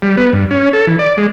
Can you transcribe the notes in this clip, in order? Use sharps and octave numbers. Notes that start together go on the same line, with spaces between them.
G3
B3
G2
C#4
A4
E3
D5
G#3